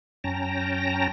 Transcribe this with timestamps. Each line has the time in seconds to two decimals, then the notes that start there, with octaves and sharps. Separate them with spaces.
0.24 F#2 C#4 G5 A5 A#5 A#6